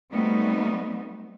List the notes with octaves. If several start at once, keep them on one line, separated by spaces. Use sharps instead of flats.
F#3 G3 A3 B3 C4 D#4